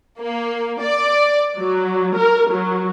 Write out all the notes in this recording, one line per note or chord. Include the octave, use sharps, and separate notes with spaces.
A#3
D5
F#3
A#4
F#3